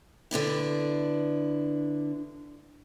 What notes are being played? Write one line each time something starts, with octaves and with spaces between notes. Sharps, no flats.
D3 B3 D4 E4